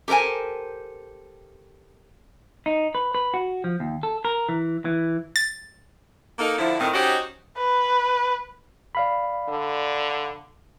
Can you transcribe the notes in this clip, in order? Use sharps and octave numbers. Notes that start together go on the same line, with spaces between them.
G4 A4 A#4 C5 G#5
D#4
B4
B4
F#4
F3
D#2
A4
A#4
E3
E3
A6
A#3 D#4 A4
D3 F3 E4
A2 D#3 C4
C#4 D#4 F#4 G4 C5 D#5
B4
D5 F5 B5
D3